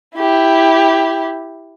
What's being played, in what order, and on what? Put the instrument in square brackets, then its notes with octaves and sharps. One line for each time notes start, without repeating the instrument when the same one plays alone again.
[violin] E4 G4